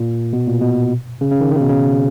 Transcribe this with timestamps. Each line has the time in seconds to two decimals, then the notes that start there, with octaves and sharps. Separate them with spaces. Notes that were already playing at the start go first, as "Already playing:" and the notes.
Already playing: A#2
0.33 B2
0.47 A#2
0.61 B2
1.21 C#3
1.32 C#3
1.41 D#3
1.51 D#3
1.56 C#3
1.61 B2
1.70 C#3